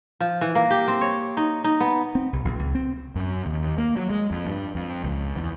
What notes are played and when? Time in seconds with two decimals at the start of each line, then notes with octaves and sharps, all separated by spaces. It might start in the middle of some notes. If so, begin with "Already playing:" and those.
0.20 F3
0.41 E3
0.55 A#3
0.71 G4
0.88 C4
1.01 C#5
1.37 D#4
1.64 D#4
1.80 B3
2.15 C4
2.33 C2
2.45 A#1
2.59 C#2
2.75 C4
3.16 F#2
3.46 D#2
3.78 A#3
3.96 F#3
4.10 G#3
4.31 F2
4.47 G2
4.75 F2
5.04 C#2
5.36 E2